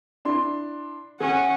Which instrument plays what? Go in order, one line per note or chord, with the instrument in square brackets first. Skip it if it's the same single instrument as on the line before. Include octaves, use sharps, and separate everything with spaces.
[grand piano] D4 E4 C6
[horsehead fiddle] C#4 F#5 [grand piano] G#4